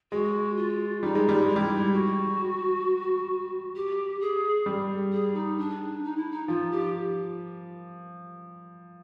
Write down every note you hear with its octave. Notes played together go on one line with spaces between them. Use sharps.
G#3 F#4
F4
G3 D#4
G#3
G3
G#3
E4
G3
F#4
G4
G#4
G3
G#4
D#4
D4
D#4
E4
D#4
F3 F4
G4